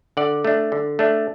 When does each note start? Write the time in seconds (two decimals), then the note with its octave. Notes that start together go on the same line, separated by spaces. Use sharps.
0.17 D3 D5 F#5
0.45 A3 D4
0.72 D3
0.99 A3 D4